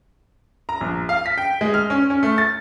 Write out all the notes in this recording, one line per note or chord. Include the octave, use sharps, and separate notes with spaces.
A#5
A#1
F5
B6
G5
G#3
F6
C#4
C#4
A3
A6